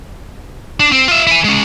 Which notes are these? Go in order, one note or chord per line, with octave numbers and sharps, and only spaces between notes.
D4
C4
F4 E5
E4 G#5
G#3 C#4